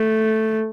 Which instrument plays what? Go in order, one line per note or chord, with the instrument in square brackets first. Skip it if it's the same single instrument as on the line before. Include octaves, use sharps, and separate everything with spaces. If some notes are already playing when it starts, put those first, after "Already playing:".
Already playing: [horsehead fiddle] A3